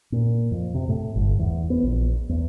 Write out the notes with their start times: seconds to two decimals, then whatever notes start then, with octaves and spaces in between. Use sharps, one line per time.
0.12 A#2
0.51 F2
0.75 C3
0.89 A2
1.16 G1
1.39 E2
1.70 B3
1.83 A#1
2.29 E2